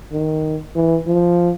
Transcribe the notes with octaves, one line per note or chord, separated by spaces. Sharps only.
D#3
E3
F3